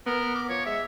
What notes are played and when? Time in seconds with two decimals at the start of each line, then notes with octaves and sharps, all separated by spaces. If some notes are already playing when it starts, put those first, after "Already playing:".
0.06 B3 A#4
0.35 D6
0.49 F3 C#5
0.66 G#3 E5